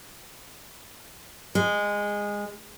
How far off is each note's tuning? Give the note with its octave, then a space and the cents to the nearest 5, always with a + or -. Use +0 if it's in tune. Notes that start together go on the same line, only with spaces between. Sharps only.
G#3 -15